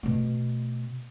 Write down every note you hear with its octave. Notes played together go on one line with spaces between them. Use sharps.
B2 A3